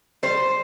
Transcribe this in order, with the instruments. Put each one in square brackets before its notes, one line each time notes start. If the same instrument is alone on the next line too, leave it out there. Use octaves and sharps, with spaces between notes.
[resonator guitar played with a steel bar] G3 C5